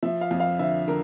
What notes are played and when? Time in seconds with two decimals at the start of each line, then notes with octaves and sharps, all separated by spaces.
0.03 F3 E5
0.21 F5
0.31 F2
0.40 F5
0.59 D3 E5
0.88 D3 A#4